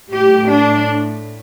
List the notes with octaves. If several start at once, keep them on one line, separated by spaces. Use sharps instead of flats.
A2 A3 G4
D4